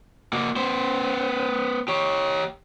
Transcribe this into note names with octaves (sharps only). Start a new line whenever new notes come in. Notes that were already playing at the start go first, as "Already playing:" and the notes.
A#3 F#4
B3 C5
G4 C#5